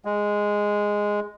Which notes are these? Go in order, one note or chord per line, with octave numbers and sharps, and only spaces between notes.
G#3